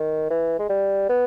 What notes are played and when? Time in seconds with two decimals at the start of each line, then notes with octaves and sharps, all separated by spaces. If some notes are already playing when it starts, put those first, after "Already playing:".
Already playing: D#3
0.30 E3
0.59 G#3
0.70 G3
1.09 B3